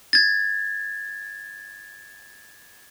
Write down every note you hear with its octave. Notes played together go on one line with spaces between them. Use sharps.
G#6 A6